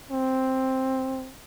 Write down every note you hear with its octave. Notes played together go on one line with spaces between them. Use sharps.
C4